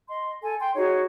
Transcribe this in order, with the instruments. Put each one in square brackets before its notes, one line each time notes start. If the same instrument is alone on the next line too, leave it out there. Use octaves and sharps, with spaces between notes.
[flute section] D#5 C6
A4 G#5
G5 C6
D#4 F#4 G#4 C#5